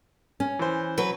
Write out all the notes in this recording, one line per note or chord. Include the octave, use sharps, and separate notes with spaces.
C#4
E3 C5
F#3 B4